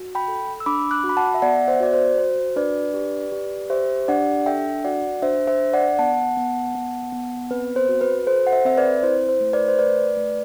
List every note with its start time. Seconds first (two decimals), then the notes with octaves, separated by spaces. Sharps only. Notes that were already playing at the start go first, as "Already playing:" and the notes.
Already playing: F#4
0.15 G5 B5
0.28 A4
0.60 E6
0.66 D4 B5 D6
0.91 D6 F#6
1.04 F#4
1.09 B5
1.17 F#5 A5
1.34 E5
1.42 B3 D5 F#5
1.68 C5 E5
1.80 F#4 D5
1.93 C5
2.18 F#4 C5
2.56 D4 B4 D5
2.94 G4
3.32 G4
3.70 G4 C5 E5
4.08 D4 D5 F#5
4.46 A4 E5 G5
4.84 F#4 D5 F#5
5.22 D4 C5 E5
5.47 C5 E5
5.60 D4
5.73 D5 F#5
5.99 B3 F#5 A5
6.37 B3
6.75 B3
7.12 B3
7.51 C4 B4
7.76 C5
7.89 F#4
8.01 B4
8.27 A4 C5
8.47 F#5
8.52 C5 E5
8.65 C4 E5
8.77 B4 D5
9.03 E4 C5
9.29 C5
9.41 A3
9.53 B4 D5
9.68 C5
9.79 A3 B4 D5
10.17 A3